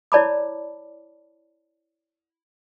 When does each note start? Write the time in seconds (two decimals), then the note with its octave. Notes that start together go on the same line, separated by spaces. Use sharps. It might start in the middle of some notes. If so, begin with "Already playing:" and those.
0.12 E4 C#5 D5 A5 B5 D6